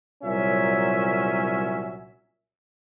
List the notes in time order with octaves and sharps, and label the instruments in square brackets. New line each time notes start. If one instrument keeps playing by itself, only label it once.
[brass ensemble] C2 A#2 F#3 C#4 E5